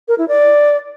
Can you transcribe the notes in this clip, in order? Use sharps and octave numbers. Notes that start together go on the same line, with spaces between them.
A#4
E4
D5